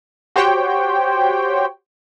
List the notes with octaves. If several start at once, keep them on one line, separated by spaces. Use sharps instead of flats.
F#4 G4 C5 C#5 G5